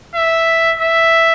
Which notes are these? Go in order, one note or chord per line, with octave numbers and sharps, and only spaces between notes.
E5
E5